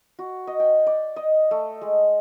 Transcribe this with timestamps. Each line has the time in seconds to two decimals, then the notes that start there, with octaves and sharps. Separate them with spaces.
0.19 F#4
0.47 D#5
0.60 G5
0.86 D5
1.16 D#5
1.51 A3
1.81 G#3